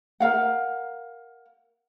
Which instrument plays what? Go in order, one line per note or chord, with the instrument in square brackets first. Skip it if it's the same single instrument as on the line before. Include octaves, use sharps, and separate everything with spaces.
[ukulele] A#4 F5 F#5